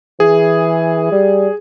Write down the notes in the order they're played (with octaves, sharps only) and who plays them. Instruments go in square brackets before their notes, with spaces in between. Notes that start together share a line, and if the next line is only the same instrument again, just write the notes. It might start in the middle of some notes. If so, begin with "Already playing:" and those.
[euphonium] E3 [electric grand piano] G#4
[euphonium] G3